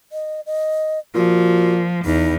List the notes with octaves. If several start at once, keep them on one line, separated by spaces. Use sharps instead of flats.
D#5
D#5
A#2 F3 F#4
E2 D#4